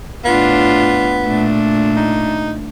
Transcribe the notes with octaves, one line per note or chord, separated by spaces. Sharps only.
A2 B3 D4 F4
A#2 A3 D4
D#4